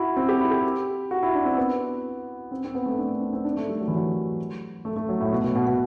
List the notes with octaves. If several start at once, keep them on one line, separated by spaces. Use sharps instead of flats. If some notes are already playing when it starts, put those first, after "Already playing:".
Already playing: E4 F#4
C4
G4
E4
G4
F#4
E4
D4
C4
B3
C4
C4
B3
A3
D4
C4
C4
D4
A3
G3
F#3
E3
F#3
A3
A3
F#3
A2
B2
B2
B2
B2